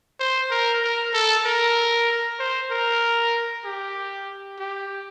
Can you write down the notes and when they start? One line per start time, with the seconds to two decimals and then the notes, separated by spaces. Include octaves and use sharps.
0.20 C5
0.51 A#4
0.82 A#4
1.14 A4
1.45 A#4
2.39 C5
2.70 A#4
3.65 G4
4.59 G4